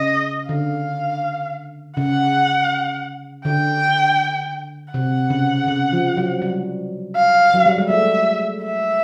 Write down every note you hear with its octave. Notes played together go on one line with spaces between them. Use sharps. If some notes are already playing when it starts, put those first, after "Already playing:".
Already playing: C#3 D#5
D3 F5
C#3 F#5
D3 G5
C3 F#5
C#3
C#3
F3
F#3
G3
F5
F#3
G3
G#3
A3 E5
E5